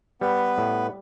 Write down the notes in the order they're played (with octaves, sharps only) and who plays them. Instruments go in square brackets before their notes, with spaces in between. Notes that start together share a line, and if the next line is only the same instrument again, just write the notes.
[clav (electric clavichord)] G3 [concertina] B3 B4
[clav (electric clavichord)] A2